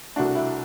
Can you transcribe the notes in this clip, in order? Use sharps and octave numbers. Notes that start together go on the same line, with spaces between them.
C2 B2 A3 D4 F#4
E4